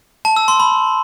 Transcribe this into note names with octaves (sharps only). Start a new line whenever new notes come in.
A5
E6
C6
B5